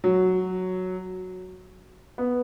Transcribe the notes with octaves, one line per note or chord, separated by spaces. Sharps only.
F#3
B3